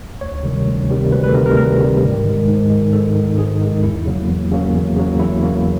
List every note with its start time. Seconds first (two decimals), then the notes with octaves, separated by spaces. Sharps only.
0.21 D2 C#5
0.44 C3 D#3 G3
0.67 D2
0.90 C3 D#3 G3
1.12 D2 B4
1.24 B4
1.29 A4
1.34 C3 D#3 G3 A#4
1.46 A#4
1.57 D2 A#4
1.79 C3 D#3 G3
2.03 G#2
2.25 D#3 G#3
2.48 G#2
2.70 D#3 G#3
2.93 G#2 A4
3.15 D#3 G#3
3.38 G#2 G#4
3.61 D#3 G#3
3.83 E2 E4
4.06 C#3 F#3 A#3
4.28 E2
4.51 C#3 F#3 A#3
4.74 E2
4.96 C#3 F#3 A#3
5.19 E2 E4
5.42 C#3 F#3 A#3